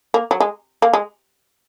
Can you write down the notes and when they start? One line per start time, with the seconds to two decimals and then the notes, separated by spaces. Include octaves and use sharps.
0.14 A#3
0.31 F#3
0.40 G#3
0.82 A#3
0.93 G#3